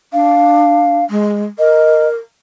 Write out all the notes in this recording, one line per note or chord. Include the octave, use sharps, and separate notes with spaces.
D4 F5
G#3
A#4 D#5